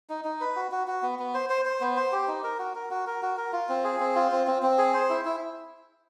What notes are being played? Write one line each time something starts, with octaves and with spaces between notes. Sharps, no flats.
D#4
D#4
B4
F#4
F#4
F#4
B3
B3
C5
C5
C5
B3
C5
G4
D#4
A#4
F#4
A#4
F#4
A#4
F#4
A#4
F4
C4
G#4
C4
F4
C4
C4
C4
G#4
C5
E4
E4